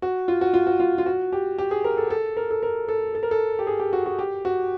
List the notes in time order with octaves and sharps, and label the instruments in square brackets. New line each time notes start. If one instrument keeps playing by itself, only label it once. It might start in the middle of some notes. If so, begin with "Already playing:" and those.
[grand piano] F#4
F4
F#4
F4
F#4
F4
F4
F#4
G4
G4
G#4
A#4
A4
A4
A#4
A4
A#4
A4
A4
A#4
A4
G4
G#4
G4
F#4
F#4
G4
F#4